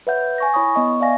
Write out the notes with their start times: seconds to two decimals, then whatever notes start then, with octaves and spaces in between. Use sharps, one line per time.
0.07 B4 C#5 E5 F#5 G6
0.38 G#5 C#6 A#6
0.54 E4 C#5 B5 C#6 D#6
0.75 B3 D#5 C#6
1.00 D5 E5 F5 G#5 A#6